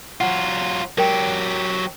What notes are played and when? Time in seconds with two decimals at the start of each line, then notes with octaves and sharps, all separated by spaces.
0.21 F#3 F4 F#5
0.98 F#3 G4 A#4 G5